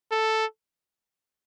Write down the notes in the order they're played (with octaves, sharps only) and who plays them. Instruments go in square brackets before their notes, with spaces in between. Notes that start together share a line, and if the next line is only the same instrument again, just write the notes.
[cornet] A4